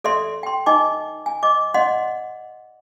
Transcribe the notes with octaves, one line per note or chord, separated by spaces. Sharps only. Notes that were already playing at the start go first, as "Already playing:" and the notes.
A4 D5 E5 C6
G5 C6
D#4 D#5 G#5 D6
G#5
D#5 D6
D5 D#5 F#5 C6